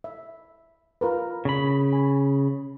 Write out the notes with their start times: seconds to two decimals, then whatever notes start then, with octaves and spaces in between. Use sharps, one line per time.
0.04 E5
1.01 F4 A#4 B4
1.45 C#3 B5
1.93 G#5